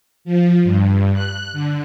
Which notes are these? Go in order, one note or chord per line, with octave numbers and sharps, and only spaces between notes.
F3
G2
F#6
D3